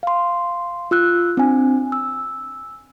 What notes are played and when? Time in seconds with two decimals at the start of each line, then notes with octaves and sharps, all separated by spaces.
0.03 F5 C6
0.91 F4 E6 F#6
1.37 C4 D4 G#5
1.92 E6